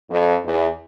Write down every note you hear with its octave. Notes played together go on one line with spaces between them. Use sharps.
F2
E2